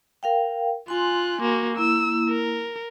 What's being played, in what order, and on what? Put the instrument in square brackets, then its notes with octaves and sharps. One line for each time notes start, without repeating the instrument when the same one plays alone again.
[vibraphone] A#4 F5 G5
[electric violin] F4 F#6 [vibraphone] G#5 C6
[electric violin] A#3 F#4
[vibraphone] A#3 E4 [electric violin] E6
[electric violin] A#4